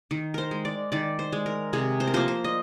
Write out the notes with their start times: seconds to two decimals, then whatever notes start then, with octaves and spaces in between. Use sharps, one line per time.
0.11 D#3
0.34 A#4 C5
0.51 G#3
0.65 D5
0.92 D#3 D5
1.19 C5
1.32 G#3
1.46 A#4
1.73 C3 G#4
2.00 C5
2.07 A#4
2.14 F3 A#3 C5
2.28 C5
2.44 D#5